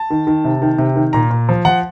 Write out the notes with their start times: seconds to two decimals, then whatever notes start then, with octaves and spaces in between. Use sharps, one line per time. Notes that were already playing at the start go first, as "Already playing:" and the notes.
Already playing: A5
0.10 D#3
0.27 D#3
0.45 C3
0.62 D#3
0.78 C3
0.96 D#3
1.13 A#2 A#5
1.30 A#2
1.49 F3
1.65 F3 F#5